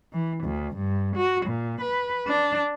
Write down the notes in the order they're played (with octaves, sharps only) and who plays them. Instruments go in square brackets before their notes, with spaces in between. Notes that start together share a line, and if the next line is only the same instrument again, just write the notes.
[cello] E3
D2
G2
F#4
A#2
B4
D4